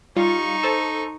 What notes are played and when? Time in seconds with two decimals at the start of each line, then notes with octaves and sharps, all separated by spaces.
0.16 G3 D#4 F4 C#6
0.63 A4 C5